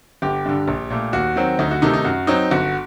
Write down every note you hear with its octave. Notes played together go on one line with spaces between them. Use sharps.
G1 G4
G2 D3
A#1
A#2 A3
D#2 F#4
D#3 F#3 C4
D2 D#4
F#4
C3 D#3 A3 D#4
D#4
F#2 F#4
F#3 C4 D#4
G1 F#4